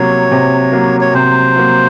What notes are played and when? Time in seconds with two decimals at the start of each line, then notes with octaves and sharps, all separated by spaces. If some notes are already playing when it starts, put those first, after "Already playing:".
Already playing: C3 F#3 A#3 C#5
0.31 C3
0.72 F#3 A#3
1.01 C#5
1.14 C3 C5
1.56 F#3 A#3